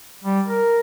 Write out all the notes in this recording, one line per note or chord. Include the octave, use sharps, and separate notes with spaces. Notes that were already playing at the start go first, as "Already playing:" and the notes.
G3
A#4